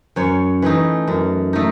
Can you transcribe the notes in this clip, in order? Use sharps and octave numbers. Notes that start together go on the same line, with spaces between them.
F#2 C#5
E3 A3 D#4
F#2
A3 D#4